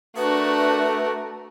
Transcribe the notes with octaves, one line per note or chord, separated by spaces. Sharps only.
A3 D4 F#4 A#4 B4